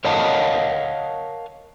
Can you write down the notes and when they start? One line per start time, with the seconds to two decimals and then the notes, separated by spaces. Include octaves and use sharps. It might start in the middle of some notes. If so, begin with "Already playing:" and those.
0.05 A#4 C#5 D#5 F5 F#5 A5